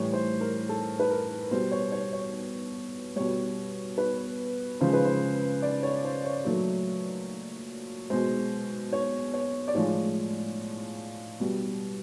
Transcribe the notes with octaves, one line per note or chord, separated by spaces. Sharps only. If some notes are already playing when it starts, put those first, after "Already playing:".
Already playing: A2 E3 G3 C#5
C5
A#4
A4
B4
A#4
B2 G3 C5
C#5
C#5
C#5
B2 G3 C#5
B4
C#3 F3 G#3 C5
B4
C5
D5
C#5
C5
C#5
A#2 F#3 A3
B2 G#3 C5
C#5
C#5
D5
A2 F3 G#3 C#5
B2 G3